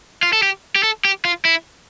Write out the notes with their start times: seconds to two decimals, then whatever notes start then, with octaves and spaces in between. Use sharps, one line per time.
0.23 F4
0.33 A4
0.43 G4
0.75 G4
0.83 A4
1.05 G4
1.25 F4
1.45 E4